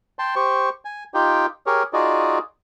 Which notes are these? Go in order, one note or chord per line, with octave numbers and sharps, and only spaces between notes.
G5 A5 C6
G4 C5 C#6
G#5
D#4 F4 G4 G5
G4 G#4 A#4 C#5
D#4 F4 F#4 G#4 D5 D#5